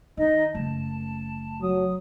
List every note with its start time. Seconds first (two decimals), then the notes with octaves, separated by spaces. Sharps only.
0.17 D#3 D#4 D#5
0.55 F#1 A3 A5
1.62 F#3 D#6